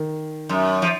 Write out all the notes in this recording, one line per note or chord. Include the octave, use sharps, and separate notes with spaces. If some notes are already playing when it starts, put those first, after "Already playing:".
Already playing: D#3
F#2
F3